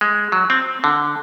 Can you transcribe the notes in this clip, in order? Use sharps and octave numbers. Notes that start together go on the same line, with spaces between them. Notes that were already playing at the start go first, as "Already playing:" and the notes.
G#3
F#3
C4
D3